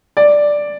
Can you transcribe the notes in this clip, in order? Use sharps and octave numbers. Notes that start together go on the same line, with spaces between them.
D5